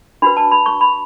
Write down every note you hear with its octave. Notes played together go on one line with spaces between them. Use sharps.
D4 F#4 B4 B5
A5
B5
C#6
B5